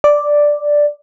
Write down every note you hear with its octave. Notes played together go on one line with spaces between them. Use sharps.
D5